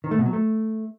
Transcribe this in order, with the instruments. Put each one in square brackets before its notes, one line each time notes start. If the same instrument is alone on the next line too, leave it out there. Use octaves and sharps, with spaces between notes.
[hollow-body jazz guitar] D#3
A3
B2
F#3
A3